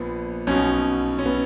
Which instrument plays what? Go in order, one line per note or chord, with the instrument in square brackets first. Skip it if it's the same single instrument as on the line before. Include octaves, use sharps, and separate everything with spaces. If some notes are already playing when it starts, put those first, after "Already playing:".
Already playing: [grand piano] A#1 A#2 B3
B1 B2 C#4
C#4
B3